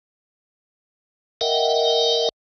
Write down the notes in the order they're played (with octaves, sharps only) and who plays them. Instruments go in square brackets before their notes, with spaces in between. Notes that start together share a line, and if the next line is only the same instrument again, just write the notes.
[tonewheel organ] A#4 D#5 E5 F#5 G5